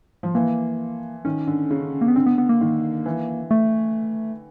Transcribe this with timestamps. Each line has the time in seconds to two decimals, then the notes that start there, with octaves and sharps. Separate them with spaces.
0.23 F3
0.35 E3 A#3
1.25 D#3 C#4
1.47 D3
1.70 C#3
2.01 A#3
2.08 B3
2.16 D3 C4
2.27 B3
2.38 B3
2.49 A#3
2.61 D#3
3.06 E3
3.51 A3